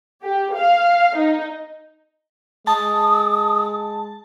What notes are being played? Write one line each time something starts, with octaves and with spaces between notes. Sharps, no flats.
G4
F5
D#4
G#3 A5 D#6